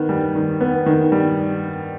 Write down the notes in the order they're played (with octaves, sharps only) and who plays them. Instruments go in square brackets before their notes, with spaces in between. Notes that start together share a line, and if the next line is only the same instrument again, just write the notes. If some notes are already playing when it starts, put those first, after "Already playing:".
Already playing: [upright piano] D#3 B3
G3
D#3
B3
D#3
G3